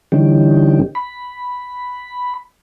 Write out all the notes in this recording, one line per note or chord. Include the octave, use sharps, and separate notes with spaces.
D3 E3 G3 C#4 D#4 G4
B5